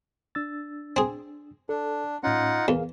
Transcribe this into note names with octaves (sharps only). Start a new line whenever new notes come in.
D4 E6 A6
C4 G#4
D4 A4
A2 C#4 D#4 F4 F#5
E2 G#4 A#4 F5